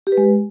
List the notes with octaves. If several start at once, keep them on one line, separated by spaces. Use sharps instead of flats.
G4
B4
G#3